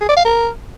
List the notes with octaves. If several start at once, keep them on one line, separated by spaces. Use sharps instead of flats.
G#4
D5
F5
A#4